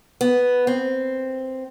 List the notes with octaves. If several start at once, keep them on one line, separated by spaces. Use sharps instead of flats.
B3
C4